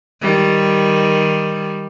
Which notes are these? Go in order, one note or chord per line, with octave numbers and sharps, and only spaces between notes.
D#3 G3